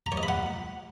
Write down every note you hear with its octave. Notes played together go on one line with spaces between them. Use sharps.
A#5
C#5
D#5
B5
F#5